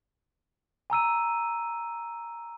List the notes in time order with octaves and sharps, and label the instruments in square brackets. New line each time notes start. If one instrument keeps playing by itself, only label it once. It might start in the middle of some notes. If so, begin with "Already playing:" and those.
[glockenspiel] G#5 A#5 E6 D#7